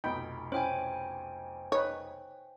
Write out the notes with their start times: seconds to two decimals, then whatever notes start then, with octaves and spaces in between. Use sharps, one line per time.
0.04 F1 B1 D#4 G5 B5
0.52 C#4 E4 C5 G5 G#5
1.72 D#4 B4 C#5